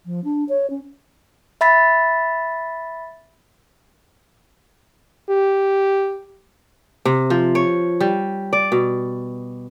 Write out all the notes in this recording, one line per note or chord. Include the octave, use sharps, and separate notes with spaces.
F3
D4
C#5
C#4
E5 B5 A6 B6
G4
C3
F3
C#5
G3
D5
B2